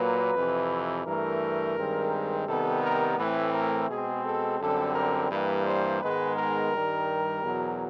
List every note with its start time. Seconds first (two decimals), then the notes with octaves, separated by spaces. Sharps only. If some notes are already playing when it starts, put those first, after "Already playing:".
Already playing: A#2 F#3 A#3 B4
0.35 F2 C3 E3
1.06 G2 E3 A3 A#4
1.77 G2 D#3 G#3 C4
2.48 C3 D#3 G3 B3 A4
2.83 A#4
3.18 A2 E3 A3 C4 B4
3.53 A#4
3.89 B2 G#3 C4 G#4
4.24 A4
4.60 F#2 D3 G3 C4 A4
4.95 A#4
5.30 G2 E3 G3 A#3 B4
5.66 C5
6.02 G#2 D#3 G#3 B3 B4
6.36 A#4
6.72 G2 D#3 G3
7.43 E2 B2 F#3